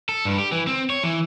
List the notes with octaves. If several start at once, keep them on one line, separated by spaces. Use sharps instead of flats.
A4
G2
G4
E3
C4
C#5
E3